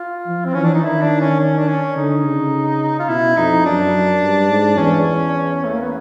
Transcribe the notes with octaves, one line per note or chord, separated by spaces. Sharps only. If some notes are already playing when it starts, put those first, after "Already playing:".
Already playing: F4
F3
C4
E3 C#4
D4
D#4
D#3 E4
D4
C#4
C#4
D4
C#4
D3 D#4
C#3
F4
B2 E4
F2 D#4
F#2 D4
G2
G#2
E2 C#4
A3
A#3
B3